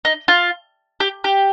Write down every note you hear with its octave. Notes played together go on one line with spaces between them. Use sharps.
D#4
F4
G4
G4